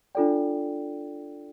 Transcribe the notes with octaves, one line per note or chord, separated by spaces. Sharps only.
D4 F4 A4 D5 G5